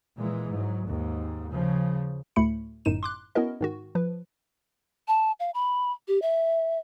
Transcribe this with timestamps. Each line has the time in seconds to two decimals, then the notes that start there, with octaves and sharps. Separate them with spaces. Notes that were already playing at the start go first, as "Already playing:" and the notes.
0.19 A#2 E3 G#3
0.52 G#2 F#3
0.86 D#2 G#2
1.52 C#3 F3
2.36 D2 A2 A3 B5 C#7
2.85 G1 F#2 A2 D#4 D#7 E7
3.03 C6 D6 F#6
3.35 B3 C#4 E4 F#4 A#4 D#5
3.61 G#2 D#3 F#4
3.95 F3 B4
5.08 A5
5.40 F5
5.54 B5
6.08 G4
6.22 E5